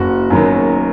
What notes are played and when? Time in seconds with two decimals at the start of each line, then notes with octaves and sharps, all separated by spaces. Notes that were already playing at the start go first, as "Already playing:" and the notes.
Already playing: F#1 F#4
0.30 F#2 D#3 F#3 B3